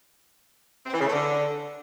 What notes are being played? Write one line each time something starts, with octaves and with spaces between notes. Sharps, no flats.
C4
E3
C#3
A3
D3